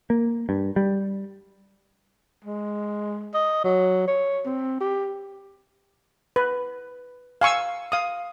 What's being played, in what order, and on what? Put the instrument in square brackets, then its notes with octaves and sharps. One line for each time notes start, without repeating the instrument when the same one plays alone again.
[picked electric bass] A#3
G2
G3
[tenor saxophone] G#3
D#5
F#3
C#5
C4
G4
[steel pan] B4
F5 G#5 C#6 E6
F5 D#6